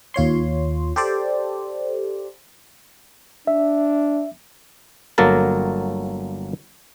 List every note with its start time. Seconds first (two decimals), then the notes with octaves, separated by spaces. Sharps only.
0.14 D#2 F4 C#5 C6
0.96 G4 A4 C5 D5
3.47 D4 E5
5.18 G1 F#3 A#3 A4 A#4 A5